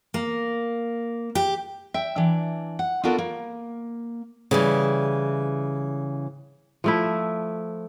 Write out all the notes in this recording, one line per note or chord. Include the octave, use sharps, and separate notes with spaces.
A#3
G4
E5 G5
E3 D4
F#5
B3 D4 F4 F#4 A4 A#4
A#3
C#3 E3 G3
F3 A3 E4